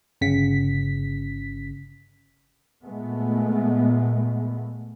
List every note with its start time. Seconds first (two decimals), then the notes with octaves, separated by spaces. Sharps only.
0.21 G1 C#3 B6
2.82 A#2 G#3 A3 B3